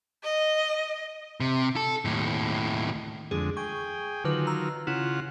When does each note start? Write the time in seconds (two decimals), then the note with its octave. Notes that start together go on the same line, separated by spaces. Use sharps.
0.24 D#5
1.40 C3
1.76 A4
2.05 D#2 A2
3.31 F2 D3 G#3 G#4
3.57 G#4 G5 C#6
4.24 D3 D#3 F#3 F4 B4 F#7
4.47 A#5 E6
4.87 C#3 E4 F4 F#5